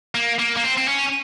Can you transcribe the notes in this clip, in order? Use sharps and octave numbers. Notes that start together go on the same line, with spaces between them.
A#3
A#3
A#3
C4
C4
C#4